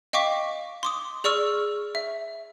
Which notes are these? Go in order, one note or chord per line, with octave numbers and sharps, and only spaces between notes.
D#5 F5 G5 C#6 D6 B6
C6 D6 D#6
G#4 D5 C#6 E6 F6
E5